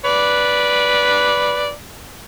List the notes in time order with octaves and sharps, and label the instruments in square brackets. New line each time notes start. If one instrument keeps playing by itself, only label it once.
[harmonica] B4 D5